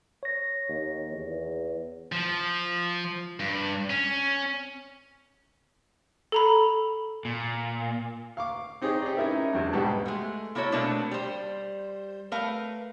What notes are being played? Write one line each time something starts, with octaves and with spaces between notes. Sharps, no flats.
C#5 A#6
D#2
E2
F3
G2
C#4
A4 A#5 B5
A#2
F5 C#6 D6
C4 D#4 G4 G#4 C#5
G4 D5
C#4 D#4 E4 A#4 E5
E2 F#3 D4
G#2 B2 G3 G4 F#5 A5
G#3 A3
A#3 E4 F#4 A4 C#5 E5
B2 A3 A#3 D4 C5
G3 C5
A3 A#4 B4 F5